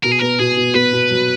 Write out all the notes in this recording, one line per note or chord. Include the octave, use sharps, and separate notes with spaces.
B2 A#4
G#4
B3 A#4
B2 G#4
B2
B3 B4
B2
F#3